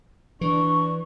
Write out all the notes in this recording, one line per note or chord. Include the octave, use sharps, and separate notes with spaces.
E3 D4 C#6